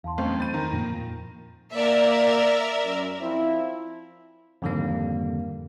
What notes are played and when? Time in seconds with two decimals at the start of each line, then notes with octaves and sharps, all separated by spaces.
0.04 E2 F5 A5 C6
0.18 B1 F#2 A3 C4 C#6 G6
0.40 B5 G6 A6 D#7
0.54 D#3 A#5
0.73 F2 A#2 A#6
1.73 A#3 A#4 D5 E5
2.84 F#2
3.21 F3 C4 E4
4.62 F2 G#2 D3 D#3 G3 A#3